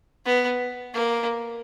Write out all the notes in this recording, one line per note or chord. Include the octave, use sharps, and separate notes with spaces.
B3
A#3